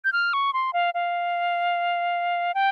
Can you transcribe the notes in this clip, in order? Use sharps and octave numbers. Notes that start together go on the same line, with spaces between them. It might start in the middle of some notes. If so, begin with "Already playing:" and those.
G6
F6
C#6
C6
F5
F5
G5